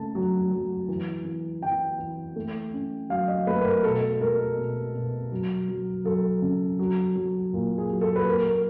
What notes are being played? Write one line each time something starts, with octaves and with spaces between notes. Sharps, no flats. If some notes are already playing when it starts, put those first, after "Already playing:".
Already playing: C#3 A3 A5
F#3
F#3
E3
E3
E3 G5
E3
A3
C#4
F#3 F5
D#5
A3 B4
B4
A#4
B2 A4
G#3 A#4
B2
B2
F#3
F#3
F#3 A4
C#3
F#3
F#3
A#2
G#4
F#3
A4
B4
A#3 A#4
A#4